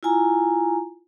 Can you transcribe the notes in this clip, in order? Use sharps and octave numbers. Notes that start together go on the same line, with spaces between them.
E4 F4 G#5 A#5